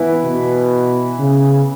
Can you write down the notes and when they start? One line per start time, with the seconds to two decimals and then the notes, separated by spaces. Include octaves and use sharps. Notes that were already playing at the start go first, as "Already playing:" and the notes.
Already playing: E3 B3 E4 B4
0.24 B2
1.19 C#3